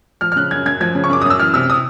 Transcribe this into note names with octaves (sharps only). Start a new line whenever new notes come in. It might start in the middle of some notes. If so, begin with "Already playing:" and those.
F3 F6
F6
C#3 F#6
F#2 G#6
F#2 G#6
F3 G#6
C#3
C#6
F#2 D6
F#2 D#6
E6
E3 F6
C3 E6
D#6